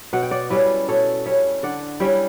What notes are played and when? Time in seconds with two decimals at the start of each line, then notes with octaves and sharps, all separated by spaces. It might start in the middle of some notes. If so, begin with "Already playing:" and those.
0.13 B2 F#5
0.23 G5
0.31 D5 F#5
0.50 G3 C#4 E4 B4 D5
0.88 B2 A4 C#5
1.25 G3 C#4 E4 C#5 E5
1.63 D3 D5 F#5
2.00 G3 C#4 E4 E5 G5